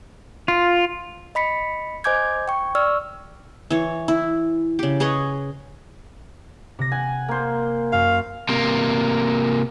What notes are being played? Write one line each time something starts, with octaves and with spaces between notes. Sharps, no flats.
F4
D#5 B5 B6 C#7
C5 D#5 G#5 D6 G6 G#6
G5 C#6
D5 C#6 E6 F6
E3 C#5
E4
C#3 G4
G#4 B4 C#5 D#5
C3 A#6
F#5 G#5
A#3 C5
F#2 F5
C3 A#3